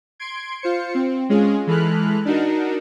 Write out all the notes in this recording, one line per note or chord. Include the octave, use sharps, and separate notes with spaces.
C6 G#6 D7
F4 C5 C#7
C4
G#3 C#4 F4 G#4
E3 G#3 A4 B5 F6 F#6
D4 D#4 F#4 A#4